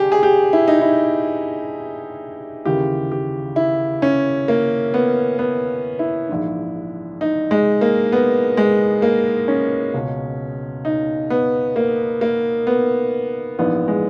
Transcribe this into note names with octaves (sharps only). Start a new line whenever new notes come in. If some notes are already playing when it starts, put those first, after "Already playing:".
Already playing: G1 G2 G4 G#4
G#4
G4
E4
D#4
E4
D#2 C#3 E3 G4
G4
E4
C#4
A#3
B3
B3
E4
A#1 G#2 E3
D#4
G#3
A#3
B3
G#3
A#3
C#4
C#2 B2
D#4
B3
A#3
A#3
B3
A#1 G#2 E3 B3
G#3